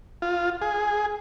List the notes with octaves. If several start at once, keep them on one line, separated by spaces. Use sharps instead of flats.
F4
G#4